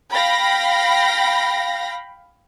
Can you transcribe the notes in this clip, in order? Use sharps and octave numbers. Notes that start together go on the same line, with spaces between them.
F5 G5 B5 A#6